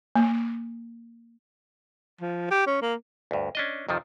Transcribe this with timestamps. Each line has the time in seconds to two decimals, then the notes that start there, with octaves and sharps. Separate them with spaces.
0.16 A#3
2.21 F3
2.51 G4
2.67 C#4
2.82 A#3
3.31 D2 G2
3.55 C#4 D4 D#5
3.89 F2 C3 D#3 F3